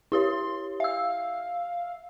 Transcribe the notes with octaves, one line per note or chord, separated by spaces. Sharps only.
E4 G4 C#5 C6
E5 F5 E6